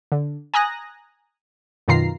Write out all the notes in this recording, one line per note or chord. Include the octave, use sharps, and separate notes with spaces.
D3
G#5 A#5 D#6 F#6 A#6
F#2 B2 D#3 F4 A#5 C7